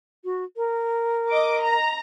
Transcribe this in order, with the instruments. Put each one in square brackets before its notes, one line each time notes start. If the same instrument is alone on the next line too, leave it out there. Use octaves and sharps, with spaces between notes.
[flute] F#4
A#4
[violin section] D#5 D6
A#5